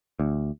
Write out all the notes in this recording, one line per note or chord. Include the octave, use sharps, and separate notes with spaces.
D2